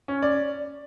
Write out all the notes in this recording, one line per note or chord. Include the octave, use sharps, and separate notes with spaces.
C#4
D5